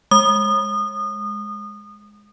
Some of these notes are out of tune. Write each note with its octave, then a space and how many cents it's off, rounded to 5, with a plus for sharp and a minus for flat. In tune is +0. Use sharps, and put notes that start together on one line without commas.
G#3 +0 D#6 -25